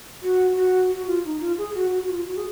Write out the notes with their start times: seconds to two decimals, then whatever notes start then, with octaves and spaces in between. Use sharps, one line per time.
0.23 F#4
0.56 F#4
0.91 F#4
1.06 F4
1.25 D#4
1.41 F4
1.58 G#4
1.75 F#4
1.92 F#4
2.03 F#4
2.09 F4
2.27 F#4
2.37 G#4